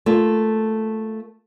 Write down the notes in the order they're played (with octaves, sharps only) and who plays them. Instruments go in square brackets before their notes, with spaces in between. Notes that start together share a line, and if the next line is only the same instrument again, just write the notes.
[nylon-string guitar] A3 A#3 F4